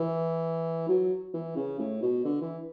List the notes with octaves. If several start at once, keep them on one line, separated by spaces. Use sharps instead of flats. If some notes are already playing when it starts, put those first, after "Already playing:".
Already playing: E3
F#3
E3
C#3
A2
B2
D3
E3